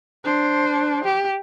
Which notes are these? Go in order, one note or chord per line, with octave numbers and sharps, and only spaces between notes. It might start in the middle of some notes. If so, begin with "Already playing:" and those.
D4 C5
G4